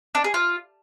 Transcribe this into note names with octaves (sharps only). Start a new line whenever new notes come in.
D4
G#4
F4